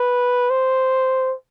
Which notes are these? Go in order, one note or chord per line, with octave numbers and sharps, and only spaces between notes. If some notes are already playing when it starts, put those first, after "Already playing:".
Already playing: B4
C5